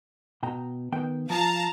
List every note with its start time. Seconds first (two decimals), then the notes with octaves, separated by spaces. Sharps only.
0.43 B2 G5 A#5
0.92 D#3 B3 G5
1.30 F3 F5 A5 A#5